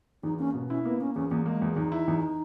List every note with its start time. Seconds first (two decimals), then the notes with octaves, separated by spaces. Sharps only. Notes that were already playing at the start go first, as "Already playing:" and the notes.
0.23 E2 D#4
0.39 A#3 C#4
0.54 B2
0.69 C#4 E4
0.84 A#3 B3
1.00 A#3 C#4
1.15 E2 C#4
1.30 E2 A#3
1.46 G#3 A#3
1.62 E2
1.76 E2 D#4
1.92 E4
2.08 E2